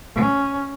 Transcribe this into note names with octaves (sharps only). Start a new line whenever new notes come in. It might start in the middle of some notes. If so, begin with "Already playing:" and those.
C#4